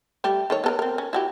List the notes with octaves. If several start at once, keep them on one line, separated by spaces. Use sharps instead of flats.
G3 A3 G4
D#3 A4 C#5
B3 A4 A#4
C4 A#4
C#4
E4 F#4 G4